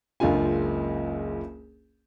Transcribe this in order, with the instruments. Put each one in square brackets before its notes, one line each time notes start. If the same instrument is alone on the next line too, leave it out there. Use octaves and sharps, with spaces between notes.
[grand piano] F#1 C#2 D4 F4 G#5